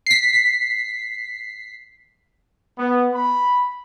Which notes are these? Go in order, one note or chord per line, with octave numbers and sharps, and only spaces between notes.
B6 C7
B3
B5